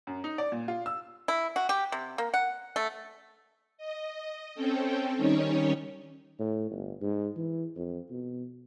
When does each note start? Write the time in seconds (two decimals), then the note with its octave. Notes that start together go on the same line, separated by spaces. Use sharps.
0.07 F#2
0.24 D#4
0.38 D5
0.52 A#2
0.68 F4
0.86 E6
1.28 E4
1.56 F#4
1.69 G4
1.92 C3
2.18 A#3
2.34 F#5
2.76 A3
3.78 D#5
4.55 C4 C#4 A4 G5
5.16 D#3 G3 C#4 D#4 C#5
6.39 A2
6.72 G1
7.02 G#2
7.37 E3
7.76 F2
8.11 B2